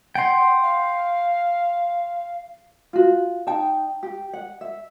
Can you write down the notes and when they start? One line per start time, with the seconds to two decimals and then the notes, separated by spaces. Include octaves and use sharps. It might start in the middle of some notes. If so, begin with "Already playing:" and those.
0.15 F#5 G5 C6
0.62 F5
2.93 F4 F#4
3.47 D#4 G5 A5
4.03 G4
4.33 F#5
4.61 E5